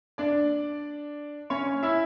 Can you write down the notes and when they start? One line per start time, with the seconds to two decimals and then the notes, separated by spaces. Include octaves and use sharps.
0.18 D4 D5
1.50 C#4 C#5
1.83 E4 E5